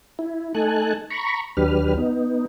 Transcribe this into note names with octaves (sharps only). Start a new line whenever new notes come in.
E4
A3 D#4 A4 G#5 A5 F#6
A#5 B5 C#6
D#2 F#3 D4 G4 B4 F6
B3 D#4